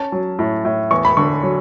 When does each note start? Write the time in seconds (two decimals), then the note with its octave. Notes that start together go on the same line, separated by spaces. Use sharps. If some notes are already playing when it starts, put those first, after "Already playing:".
Already playing: C#4 A5
0.12 F#3
0.39 A2
0.65 A2
0.91 E2 C#6
1.05 B5
1.17 D3 C#6
1.43 F#3